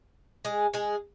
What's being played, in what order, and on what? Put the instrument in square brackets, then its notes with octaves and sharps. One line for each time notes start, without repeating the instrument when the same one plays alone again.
[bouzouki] G#3 G#4
G#3 G#4